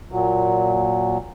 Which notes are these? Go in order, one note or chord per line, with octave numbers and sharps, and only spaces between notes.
A#2 F#3